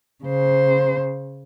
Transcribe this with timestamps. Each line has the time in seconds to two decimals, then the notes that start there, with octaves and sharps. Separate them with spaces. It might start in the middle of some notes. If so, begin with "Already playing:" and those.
0.25 C#3 C5